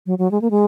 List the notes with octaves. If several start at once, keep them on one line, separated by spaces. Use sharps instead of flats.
F#3
F#3
G#3
A#3
G#3